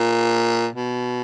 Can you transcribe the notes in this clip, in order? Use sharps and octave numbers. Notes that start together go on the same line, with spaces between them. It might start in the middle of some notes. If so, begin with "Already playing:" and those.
Already playing: A#2
B2